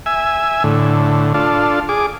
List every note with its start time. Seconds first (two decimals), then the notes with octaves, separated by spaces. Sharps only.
0.06 E5 G#5
0.64 A2 D3
1.34 D4 F4 A4
1.89 G#4 D6